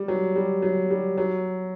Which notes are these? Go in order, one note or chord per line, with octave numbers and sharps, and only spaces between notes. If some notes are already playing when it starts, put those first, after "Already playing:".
Already playing: G3
F#3
G3
F#3
G3
F#3